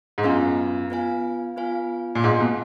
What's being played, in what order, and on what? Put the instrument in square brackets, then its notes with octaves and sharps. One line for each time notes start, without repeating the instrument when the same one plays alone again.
[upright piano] G#2
[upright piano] F#2 [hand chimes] B3 F4 B4 F5 G#5
[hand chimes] B3 F4 B4 F5 G#5
B3 F4 B4 F5 G#5
[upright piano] A#2
[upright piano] G#2 [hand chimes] B3 F4 B4 F5 G#5
[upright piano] B2